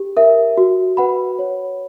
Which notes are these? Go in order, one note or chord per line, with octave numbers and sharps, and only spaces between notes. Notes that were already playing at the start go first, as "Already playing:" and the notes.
Already playing: G4
A#4 E5
F#4
B4 F#5 B5
C#5